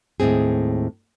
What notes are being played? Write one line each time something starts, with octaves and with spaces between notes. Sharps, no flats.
D#2 A2 G#3 C4 G#4